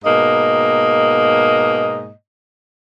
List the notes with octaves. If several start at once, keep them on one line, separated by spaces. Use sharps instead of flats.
G#2 B2 A#3 D#5